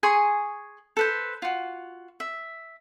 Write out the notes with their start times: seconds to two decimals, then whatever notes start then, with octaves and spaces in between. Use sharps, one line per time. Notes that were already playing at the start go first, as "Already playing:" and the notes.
0.03 G#4 G#5 C6 C#6
0.97 A4 B4 C5
1.42 F4 F#4
2.20 E5